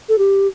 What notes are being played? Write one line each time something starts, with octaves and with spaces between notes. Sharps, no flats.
A4
G4